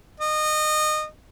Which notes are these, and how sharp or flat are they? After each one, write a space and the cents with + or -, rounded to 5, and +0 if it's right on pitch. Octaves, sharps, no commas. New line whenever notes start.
D#5 -25